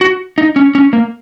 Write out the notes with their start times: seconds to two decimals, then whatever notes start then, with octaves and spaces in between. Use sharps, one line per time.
0.01 F#4
0.38 D#4
0.56 C#4
0.75 C#4
0.93 A#3